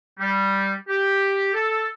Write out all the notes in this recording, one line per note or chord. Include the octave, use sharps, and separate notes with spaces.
G3
G4
A4